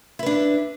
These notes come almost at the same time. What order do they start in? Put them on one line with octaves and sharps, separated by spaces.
E4 B4 D4